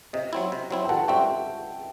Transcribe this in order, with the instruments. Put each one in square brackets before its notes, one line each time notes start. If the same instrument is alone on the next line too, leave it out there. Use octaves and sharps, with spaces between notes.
[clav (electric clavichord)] C3 [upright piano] D#5
[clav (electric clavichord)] F#3 C4 E4
C3
F#3 C4 E4
[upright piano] G5
[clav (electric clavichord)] D#3 [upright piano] F#5 A5
[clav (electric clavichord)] G3 C4 F#4 [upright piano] E5 G5